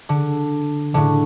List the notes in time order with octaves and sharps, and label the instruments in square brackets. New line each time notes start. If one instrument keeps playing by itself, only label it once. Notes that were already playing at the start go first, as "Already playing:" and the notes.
[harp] D3
A2 D3